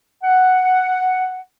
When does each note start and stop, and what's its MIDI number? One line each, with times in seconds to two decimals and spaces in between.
0.24 1.41 78